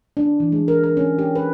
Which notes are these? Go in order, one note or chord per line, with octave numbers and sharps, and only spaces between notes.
D4
E3
G#3
A#4
A#4
C#4
G4
B4